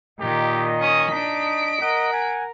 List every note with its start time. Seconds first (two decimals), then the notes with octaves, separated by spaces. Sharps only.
0.20 A#2 D#3 G4 D#5
0.80 C#4 C#6 D#6
1.11 D4 D#4 B6 D7
1.82 A#4 D#5 F#5
2.13 G#5